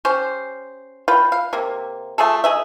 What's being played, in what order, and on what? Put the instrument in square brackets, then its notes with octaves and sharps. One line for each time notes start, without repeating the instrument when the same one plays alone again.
[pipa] C#4 G4 C5
F4 B4 F5 G5
F5
C3 A#3
A3 F4 G#4 A4
G#4 D#5 E5